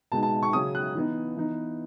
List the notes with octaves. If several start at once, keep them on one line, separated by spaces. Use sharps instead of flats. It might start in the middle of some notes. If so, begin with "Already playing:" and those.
B2 G#3 B3 D#4 A5
A5
C#6
C#3 F#3 C#4 D#6
F#6
E3 B3 D#4
E3 B3 D#4